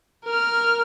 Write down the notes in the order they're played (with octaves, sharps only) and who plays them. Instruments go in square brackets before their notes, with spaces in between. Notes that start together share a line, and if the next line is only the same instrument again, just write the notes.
[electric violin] A#4 F6